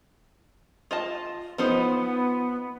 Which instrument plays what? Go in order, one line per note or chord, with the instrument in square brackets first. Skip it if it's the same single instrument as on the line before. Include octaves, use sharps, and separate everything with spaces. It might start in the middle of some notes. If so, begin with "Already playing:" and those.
[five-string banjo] F4 D#5 A5
[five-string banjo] F3 D#4 C5 [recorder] B3